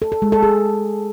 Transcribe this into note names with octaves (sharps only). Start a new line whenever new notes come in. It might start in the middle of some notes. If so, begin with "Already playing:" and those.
A4
A4
G#3
A4
G#4